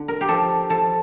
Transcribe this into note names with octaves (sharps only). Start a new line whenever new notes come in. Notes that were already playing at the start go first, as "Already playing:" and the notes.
Already playing: D3
A#4
G4
F3 A4
F3 A4